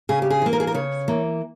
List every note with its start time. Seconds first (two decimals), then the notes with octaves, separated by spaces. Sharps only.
0.09 C#3 G#4
0.22 G4
0.30 G#4
0.42 E3 A#3
0.53 A#4
0.60 G#4
0.67 A#4
0.74 C#3 C#5
1.08 E3 A#3